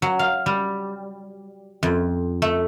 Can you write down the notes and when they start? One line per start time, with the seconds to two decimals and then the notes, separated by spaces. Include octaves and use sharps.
0.02 F#3
0.19 F5
0.46 G3
1.83 F2
2.42 A3